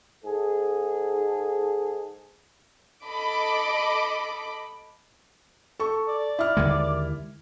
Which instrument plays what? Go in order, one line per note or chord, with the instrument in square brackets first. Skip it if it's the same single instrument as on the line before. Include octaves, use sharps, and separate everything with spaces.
[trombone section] G#2 G#4 A4
[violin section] A4 D#5 B5 D6
[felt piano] A4 C#6
[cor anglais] D5
[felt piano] E4 F6
[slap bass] D#2 D3 G#3